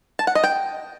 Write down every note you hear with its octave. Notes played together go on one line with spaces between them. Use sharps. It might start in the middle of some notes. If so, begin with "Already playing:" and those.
A5
F#5
D#5
G5